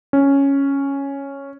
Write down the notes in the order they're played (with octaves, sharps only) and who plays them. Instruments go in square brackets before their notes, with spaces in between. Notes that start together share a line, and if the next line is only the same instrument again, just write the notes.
[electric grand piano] C#4